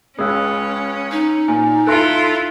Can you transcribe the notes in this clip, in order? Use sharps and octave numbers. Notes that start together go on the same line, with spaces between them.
C#2 G#3 C#4 D#6 E6 F#6
D#4
A#2 G#5
E4 F4 A4 C6 F#6 A#6 C#7 D7